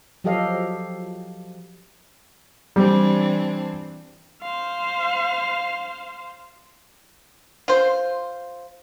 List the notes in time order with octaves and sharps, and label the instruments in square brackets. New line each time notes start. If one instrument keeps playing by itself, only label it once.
[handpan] F3 F#3 G4 A4 D#5 F5
[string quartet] E3 C4 D4 [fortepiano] G3
[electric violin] C5 F5
[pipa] F4 C5